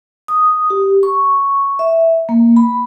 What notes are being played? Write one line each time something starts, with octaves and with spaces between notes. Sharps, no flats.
D#6
G4
C#6
E5
A#3
B5